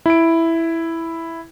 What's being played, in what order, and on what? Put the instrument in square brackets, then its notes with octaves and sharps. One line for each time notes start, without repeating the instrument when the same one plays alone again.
[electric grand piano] E4 D7